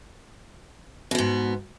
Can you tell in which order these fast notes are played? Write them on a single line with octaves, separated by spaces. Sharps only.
B2 B3 G#2